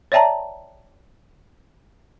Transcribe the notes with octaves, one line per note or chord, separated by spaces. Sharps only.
C#5 D5 E5 G5 A5 A#5